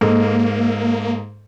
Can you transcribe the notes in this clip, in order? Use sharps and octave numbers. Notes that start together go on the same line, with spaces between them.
G#2 A#3 A4 D#5